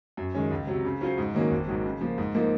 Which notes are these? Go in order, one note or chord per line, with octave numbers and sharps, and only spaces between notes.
F#2
D#3 G#3 C#4
C#2
C3 F#3
C#3
F#3 C#4 F4 C5
G#2
D#3 F#3 A#3 C#4
G#1
G#2 D#3 F#3
C#3
F3 A#3 F4
G#2
F3 A#3 D#4 A#4